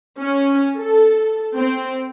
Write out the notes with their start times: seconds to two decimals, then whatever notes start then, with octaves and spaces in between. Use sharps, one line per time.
0.20 C#4
0.77 A4
1.56 C4